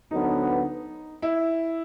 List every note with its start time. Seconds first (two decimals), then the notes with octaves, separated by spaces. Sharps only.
0.11 D2 D3 F#3 B3 D#4
1.22 E4